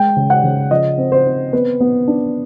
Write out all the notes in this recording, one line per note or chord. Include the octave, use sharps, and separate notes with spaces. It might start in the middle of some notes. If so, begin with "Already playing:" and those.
Already playing: G#3 G5
C#3
F#5
C#3
F3 D#5
C4
C5
C4
B3 B4
B3
D4